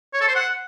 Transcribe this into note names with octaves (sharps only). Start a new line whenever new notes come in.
C#5
A4
C5
F#5